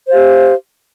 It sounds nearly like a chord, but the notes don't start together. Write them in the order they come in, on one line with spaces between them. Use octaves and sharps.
C5 F5 G4